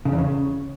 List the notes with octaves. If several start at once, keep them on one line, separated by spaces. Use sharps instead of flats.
C#3
E2
C#3